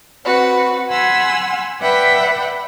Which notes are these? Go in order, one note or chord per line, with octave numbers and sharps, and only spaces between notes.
C4 F#4 B4
F#5 G#5 B5 C6 E6
B4 D5 E5 F#5 G5 B5